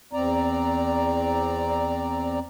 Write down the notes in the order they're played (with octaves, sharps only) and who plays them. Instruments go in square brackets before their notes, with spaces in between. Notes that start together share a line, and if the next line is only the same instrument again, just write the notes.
[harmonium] E2 C4 D5 A#5